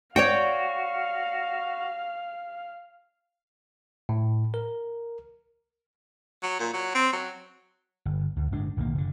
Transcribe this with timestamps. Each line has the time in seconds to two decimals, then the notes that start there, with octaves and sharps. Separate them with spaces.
0.16 F#4 C#5 D5 F5 G5
4.09 A2
4.54 A#4
6.43 F#3
6.60 A#2
6.73 F#3
6.95 C4
7.13 F#3
8.05 G1
8.36 D2
8.52 G1 A2 G#3 D4
8.77 D1 B1 D#3 A#3
8.95 F#1 D3